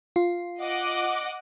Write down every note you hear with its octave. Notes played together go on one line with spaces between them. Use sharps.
F4
D#5 F#5 D6